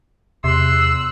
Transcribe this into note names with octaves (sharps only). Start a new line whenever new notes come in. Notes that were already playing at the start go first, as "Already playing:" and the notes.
E2 C3 C6 E6 F#6